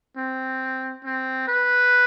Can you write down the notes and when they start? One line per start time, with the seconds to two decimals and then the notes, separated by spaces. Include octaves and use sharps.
0.17 C4
1.04 C4
1.48 B4